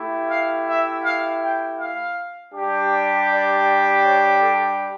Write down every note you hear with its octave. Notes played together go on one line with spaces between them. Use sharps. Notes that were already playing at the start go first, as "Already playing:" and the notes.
Already playing: A3 E4 G4
F5
E5
F5
G5
F5
G3 D4 G4
D5
D5
C#5
A4